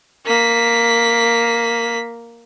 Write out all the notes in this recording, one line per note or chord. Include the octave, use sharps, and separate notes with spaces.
A#3 B6